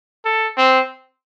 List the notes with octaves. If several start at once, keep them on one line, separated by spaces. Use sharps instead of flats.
A4
C4